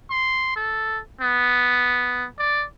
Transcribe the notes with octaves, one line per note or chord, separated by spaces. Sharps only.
C6
A4
B3
D5